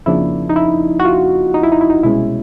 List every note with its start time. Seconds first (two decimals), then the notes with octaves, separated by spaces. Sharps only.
0.06 F2 C#3 F3 A#3 D4 E4
0.49 D#4
0.56 E4
0.99 F#4
1.05 F4
1.54 D#4
1.63 E4
1.72 D#4
1.81 E4
1.90 D#4
2.03 C2 B2 G#3 C#4 E4